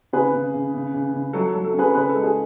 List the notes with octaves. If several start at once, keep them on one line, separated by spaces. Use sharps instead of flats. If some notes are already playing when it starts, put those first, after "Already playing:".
C#3 G#4 B4
C#3
C#3
C#3
C#3
C#3
F#3 A4
A4
F#3
A4
C#4
G#4 B4
C#3 G#4 B4
A4
G#3
G#4